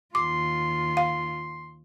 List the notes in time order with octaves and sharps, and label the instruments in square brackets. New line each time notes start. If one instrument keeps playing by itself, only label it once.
[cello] D#2 F4 [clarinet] C6 [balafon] D6
[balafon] F5